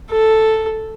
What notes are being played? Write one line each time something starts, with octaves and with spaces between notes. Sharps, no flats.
A4